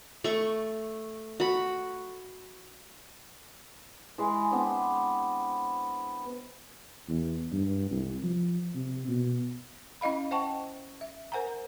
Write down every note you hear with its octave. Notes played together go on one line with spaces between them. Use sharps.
A3 C#6
F#4 B5
E3 G#3
B3 C4 D4
E2
G2
C2
F3
C3
B2
C#4 E4 D#5 F5 B5
C5 D#5 F#5 G5 A5 C#6
E5
A#4 C5 F#5 G#5 A#5